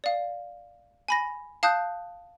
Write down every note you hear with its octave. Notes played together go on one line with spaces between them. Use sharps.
D5 F5
G#5 B5 A#6
F5 A5 D#6 F#6 G6